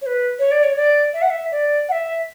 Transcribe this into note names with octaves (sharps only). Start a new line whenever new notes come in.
C#5
B4
C#5
D5
C#5
D5
E5
F#5
E5
D5
F#5
E5